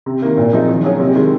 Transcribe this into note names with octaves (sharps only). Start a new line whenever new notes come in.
C3
D#3 A#3
A#2
F3 C4 D#4 G#4
D#3
F#3 C#4 G#4
C3
D#3 G#3